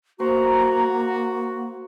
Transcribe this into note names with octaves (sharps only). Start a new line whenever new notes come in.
A#3 F#4 C5 A#5